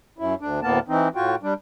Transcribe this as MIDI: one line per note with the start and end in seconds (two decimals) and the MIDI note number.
0.18 0.35 42
0.18 0.35 64
0.41 0.60 38
0.41 0.60 62
0.62 0.79 38
0.62 0.79 45
0.62 0.79 58
0.62 0.79 59
0.62 0.79 81
0.88 1.08 52
0.88 1.08 60
0.88 1.08 63
1.15 1.35 45
1.15 1.35 65
1.15 1.35 66
1.15 1.35 79
1.43 1.54 55
1.43 1.54 62